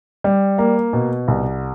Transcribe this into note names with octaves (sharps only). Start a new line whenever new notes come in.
G3
A#3
B2
C2